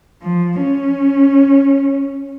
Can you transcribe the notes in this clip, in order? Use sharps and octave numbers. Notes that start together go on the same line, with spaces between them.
F3
C#4